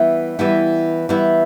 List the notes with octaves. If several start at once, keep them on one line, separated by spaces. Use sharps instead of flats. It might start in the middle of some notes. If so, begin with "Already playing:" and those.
Already playing: E3 G3 B3 E4
E3 G3 B3 E4
E3 G3 B3 E4